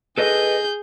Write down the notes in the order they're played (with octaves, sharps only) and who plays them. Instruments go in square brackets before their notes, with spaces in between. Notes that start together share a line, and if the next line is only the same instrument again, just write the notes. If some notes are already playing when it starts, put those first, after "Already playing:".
[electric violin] G#4 G6 [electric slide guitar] A4 B4 D#5